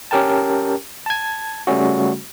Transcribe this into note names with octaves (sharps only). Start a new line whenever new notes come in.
C#4 G4 A#4 G5 A5
A5 G#6
C#3 G3 A3 C#4 F#4